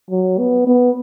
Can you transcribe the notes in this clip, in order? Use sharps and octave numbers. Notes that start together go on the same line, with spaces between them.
F#3
B3
B3